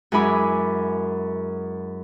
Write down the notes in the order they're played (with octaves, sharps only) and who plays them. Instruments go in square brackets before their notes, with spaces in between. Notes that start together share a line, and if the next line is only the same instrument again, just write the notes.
[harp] F#2 G#3 E4 G#5 B5 D6